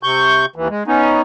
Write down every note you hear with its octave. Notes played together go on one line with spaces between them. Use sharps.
C3 C#6 G6
D#2 E3
G#3
B3 C#4 D#4